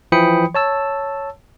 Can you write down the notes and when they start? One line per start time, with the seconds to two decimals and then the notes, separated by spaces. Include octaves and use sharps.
0.12 E3 F3 G5 B5 D#6 C#7
0.55 C#5 A5 E6